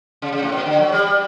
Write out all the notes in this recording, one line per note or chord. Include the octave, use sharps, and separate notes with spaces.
C#3
C#3
A2
B2
D3
F#3
G3